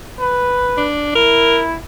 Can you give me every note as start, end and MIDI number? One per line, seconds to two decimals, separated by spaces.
0.20 0.87 71
0.77 1.11 62
1.15 1.77 64
1.15 1.62 70